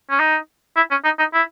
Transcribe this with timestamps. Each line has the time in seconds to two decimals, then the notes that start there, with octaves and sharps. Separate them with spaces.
0.10 C#4
0.19 D#4
0.76 E4
0.91 C#4
1.04 D#4
1.19 D#4
1.33 E4